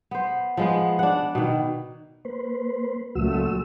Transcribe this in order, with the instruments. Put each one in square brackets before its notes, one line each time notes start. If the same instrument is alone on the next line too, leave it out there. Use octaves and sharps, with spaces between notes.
[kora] B3 C5
F3 G#3 B3
D4 F#5
B2 D#3
[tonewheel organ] A#3 B4 C5
[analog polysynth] C#2 A#2 A3 [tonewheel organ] F#3 F#4 E6